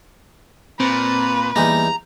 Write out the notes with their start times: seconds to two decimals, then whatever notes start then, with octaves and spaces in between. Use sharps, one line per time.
0.80 A#2 C4 B4
1.56 E2 G3 A#3 D#4 G#5 A#5 B5